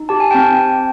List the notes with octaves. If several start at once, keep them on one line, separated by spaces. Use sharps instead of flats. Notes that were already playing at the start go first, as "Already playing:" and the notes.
Already playing: D#4
G4 A5
G#5
C4 G5 A5